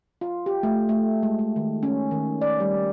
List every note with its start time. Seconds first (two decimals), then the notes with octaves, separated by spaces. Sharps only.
0.21 F4
0.46 G4
0.63 A3
0.89 A3
1.23 G#3
1.39 G#3
1.56 D#3
1.83 C#4
2.11 D#3
2.42 D5
2.60 G3